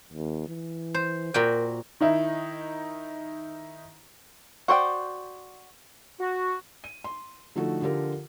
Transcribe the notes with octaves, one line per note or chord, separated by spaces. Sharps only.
D#2
E3
C5
A#2 F#4 A#4 G5
D#3 D#4 E4
F#4 C5 D5 G5
F#4
D#7
C6
D3 F3 A3 D#4 F#4 A4
D3 F3 F4 G4 A4 A#4